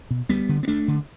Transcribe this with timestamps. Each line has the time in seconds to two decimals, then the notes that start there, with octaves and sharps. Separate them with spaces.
0.10 B2
0.29 D2 G3 B3
0.49 D3
0.63 B3
0.68 D2 A3 D4
0.88 D3